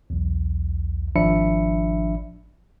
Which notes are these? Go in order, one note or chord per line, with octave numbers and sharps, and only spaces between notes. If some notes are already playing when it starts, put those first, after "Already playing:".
B1 E2
G#1 F3 D4 E5 B5 C#7